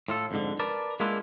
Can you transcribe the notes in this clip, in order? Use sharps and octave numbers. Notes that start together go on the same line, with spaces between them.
A2 F4 A4
F2 G#2 D3
A#4 B4 D5 A5
G#3 A#3 B3 D4 E4 F4